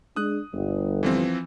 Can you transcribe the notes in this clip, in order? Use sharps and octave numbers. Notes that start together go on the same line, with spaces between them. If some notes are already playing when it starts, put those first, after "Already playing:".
G#3 D4 D#6 F#6
G1
E3 F3 C4